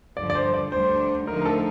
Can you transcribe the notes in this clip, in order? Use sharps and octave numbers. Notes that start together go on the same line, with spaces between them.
G2 D3 F3 D5
D5
C5
D5
D2 D3 G3 D4 C5
D3 F3 A3 D#4 A#4
A#4
A4